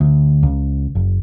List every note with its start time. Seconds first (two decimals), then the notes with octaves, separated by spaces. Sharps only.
0.01 D2
0.43 C#2
0.95 F#1